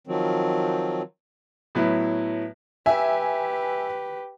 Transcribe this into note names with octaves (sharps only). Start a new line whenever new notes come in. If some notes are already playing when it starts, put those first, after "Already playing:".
D#3 F3 F#3 C4
A2 F#3 B3 E4
G4 B4 E5 G#5